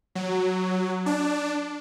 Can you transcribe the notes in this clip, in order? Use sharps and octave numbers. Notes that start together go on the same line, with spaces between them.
F#3
D4